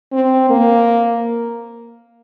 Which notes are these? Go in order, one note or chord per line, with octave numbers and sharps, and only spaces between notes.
C4
A#3